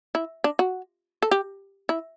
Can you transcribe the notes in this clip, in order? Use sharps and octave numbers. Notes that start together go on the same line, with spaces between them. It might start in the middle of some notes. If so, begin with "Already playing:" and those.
E4
D4
F#4
A4
G4
E4